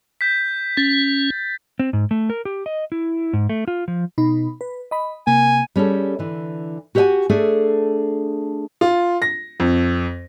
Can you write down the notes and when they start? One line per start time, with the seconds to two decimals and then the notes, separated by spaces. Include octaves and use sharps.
0.21 G6 B6
0.77 C#4 A6
1.79 C4
1.93 G#2
2.11 A3
2.30 A#4
2.45 G4
2.66 D#5
2.92 E4
3.33 G#2
3.49 A3
3.68 F4
3.88 F3
4.18 B2 D#4 B5
4.61 B4
4.91 D#5 B5
5.27 C3 A#3 G#5
5.76 G3 C#4 G#4 A4
6.19 D3 E3
6.95 F#4 G4 B4 D#5 F#5 G#5
7.30 A3 D4 G#4 A4 E5
8.81 F4
9.22 A#6
9.60 F2